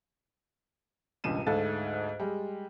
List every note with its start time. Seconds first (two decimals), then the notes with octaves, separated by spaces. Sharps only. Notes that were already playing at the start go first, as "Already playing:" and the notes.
1.24 E1 C#2 G2 D#7 E7
1.47 D2 G#2 A3 A4 F5 A6
2.20 G3 G#3